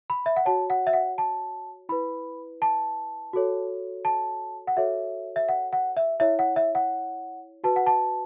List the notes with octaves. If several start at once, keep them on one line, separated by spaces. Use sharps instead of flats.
B5
E5
F#5
F#4 C#5 A5
F#5
E5
F#5
A5
E4 B4 B5
A5
F#4 A4 C#5
A5
F#5
F#4 A4 C#5 E5
E5
F#5
F#5
E5
E4 C#5 E5
F#5
E5
F#5
F#4 B4 A5
F#5
A5